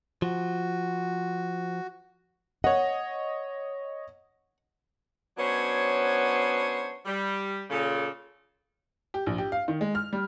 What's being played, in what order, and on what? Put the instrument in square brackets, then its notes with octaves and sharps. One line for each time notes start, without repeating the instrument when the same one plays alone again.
[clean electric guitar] F3 [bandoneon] F#4
[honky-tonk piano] C#5 D#5 [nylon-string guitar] F#5
[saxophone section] F#3 B3 C#4 D4 C5 C#5
G3
A#2 C#3 A4
[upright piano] G4
A#1
G4
F5
D#3
G#3
F6
G3